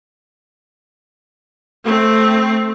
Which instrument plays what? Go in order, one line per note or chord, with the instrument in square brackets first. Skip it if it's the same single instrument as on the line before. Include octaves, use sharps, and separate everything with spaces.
[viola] A3 C4